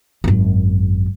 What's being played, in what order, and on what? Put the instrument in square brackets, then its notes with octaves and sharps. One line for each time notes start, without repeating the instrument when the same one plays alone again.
[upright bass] G#1 F#2